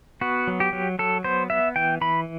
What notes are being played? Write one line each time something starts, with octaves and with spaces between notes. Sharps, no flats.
B3 F#4
F#3
G4
F#3
F#3 A4
B3 C5
B3 E5
E3 G5
E3 B5